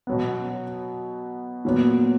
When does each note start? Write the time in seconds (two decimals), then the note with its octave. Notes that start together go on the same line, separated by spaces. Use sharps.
0.07 B2 F#3 B3
1.65 A#2 F#3 B3